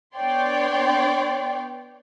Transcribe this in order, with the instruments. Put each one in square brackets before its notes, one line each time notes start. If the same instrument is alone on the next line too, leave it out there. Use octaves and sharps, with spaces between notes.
[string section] B3 D4 C#5 D5 G5 C6